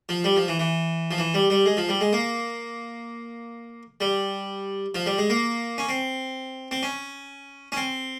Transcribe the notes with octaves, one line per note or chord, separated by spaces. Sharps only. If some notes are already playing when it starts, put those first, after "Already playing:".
F3
G3
F3
E3
E3
F3
E3
G3
G3
G#3
F3
G3
G#3
A#3
G3
F3
G3
G#3
A#3
C#4
C4
C4
C#4
C#4
C4